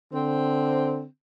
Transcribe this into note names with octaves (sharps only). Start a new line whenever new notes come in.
D3 C4